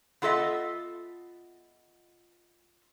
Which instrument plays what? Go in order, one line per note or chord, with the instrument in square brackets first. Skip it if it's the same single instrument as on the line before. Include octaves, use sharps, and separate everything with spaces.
[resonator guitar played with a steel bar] B3 F4 A4 D#5 E5